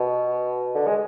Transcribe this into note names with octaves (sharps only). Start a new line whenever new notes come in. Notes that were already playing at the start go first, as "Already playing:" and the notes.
Already playing: B2
D3
G#3